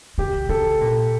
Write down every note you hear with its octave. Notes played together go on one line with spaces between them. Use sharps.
C#3 G4
C#3 A4
A#2